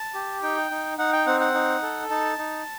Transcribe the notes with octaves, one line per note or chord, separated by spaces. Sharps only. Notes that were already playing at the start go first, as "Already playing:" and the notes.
Already playing: A5
G4
D#4 G5
D#4
D#4 F#5
G5
C4 F#5
F#5
D#4
A4
D#4 A5
D#4